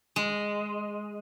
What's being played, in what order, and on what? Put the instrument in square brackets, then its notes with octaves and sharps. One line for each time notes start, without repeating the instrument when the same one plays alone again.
[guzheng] G#3